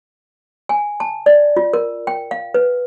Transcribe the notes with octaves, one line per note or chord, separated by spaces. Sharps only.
G#5
A5
D5
F4
A#4
G5
F5
B4